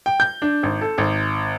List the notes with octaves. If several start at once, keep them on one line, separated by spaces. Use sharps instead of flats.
G5
G6
D4
G#1
A4
G#1